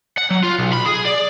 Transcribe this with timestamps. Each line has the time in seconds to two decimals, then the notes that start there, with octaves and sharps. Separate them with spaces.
0.18 F#5
0.30 F#3
0.44 F4
0.58 B1
0.73 B5
0.86 G#4
1.05 D5